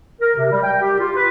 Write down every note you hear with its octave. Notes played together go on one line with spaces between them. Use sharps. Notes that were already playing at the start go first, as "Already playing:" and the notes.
A#4
C3
G3
G5
G4
F4
B4